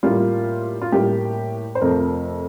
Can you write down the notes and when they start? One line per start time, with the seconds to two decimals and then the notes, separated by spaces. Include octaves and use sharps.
0.03 A2 G3 A#3 F4
0.82 F4
0.92 A2 G3 A#3 G4
1.75 C5
1.81 F2 C3 F3 A3 A#4